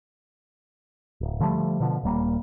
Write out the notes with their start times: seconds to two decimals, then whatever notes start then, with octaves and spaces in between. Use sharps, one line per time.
1.21 D1
1.40 D3 F3 G3 A3
1.80 B2 D3 F3
2.04 D#1 G3 A#3